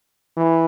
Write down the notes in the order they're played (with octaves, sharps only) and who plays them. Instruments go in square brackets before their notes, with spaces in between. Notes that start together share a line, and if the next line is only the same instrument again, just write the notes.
[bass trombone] E3